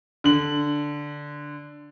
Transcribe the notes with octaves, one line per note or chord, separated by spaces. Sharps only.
D3 F#7